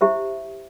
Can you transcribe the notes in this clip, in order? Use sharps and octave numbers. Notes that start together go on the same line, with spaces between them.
E4 G4 C5 E5